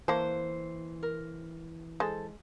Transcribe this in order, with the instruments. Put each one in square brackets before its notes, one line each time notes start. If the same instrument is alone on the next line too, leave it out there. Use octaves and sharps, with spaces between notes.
[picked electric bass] E3 [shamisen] A#3 A5 [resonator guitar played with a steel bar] C5
[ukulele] A#4
[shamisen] G#3 [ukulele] A4 C5